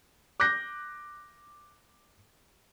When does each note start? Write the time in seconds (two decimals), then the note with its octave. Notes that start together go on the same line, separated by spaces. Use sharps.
0.40 D6 F#6 G6 A#6